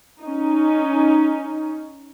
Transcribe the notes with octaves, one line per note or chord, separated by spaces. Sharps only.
C#4 D#4